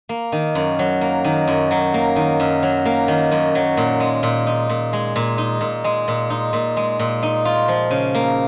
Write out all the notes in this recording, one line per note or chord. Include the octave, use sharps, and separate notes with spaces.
A#3
D#3
F#2
F#3
A#3
D#3
F#2
F#3
A#3
D#3
F#2
F#3
A#3
D#3
F#2
F#3
A#2
G#3
A#2
D#4
A#2
G#3
A#2
D#4
A#2
G#3
A#2
D#4
A#2
G#3
A#2
D#4
F4
F3
C#3
A#3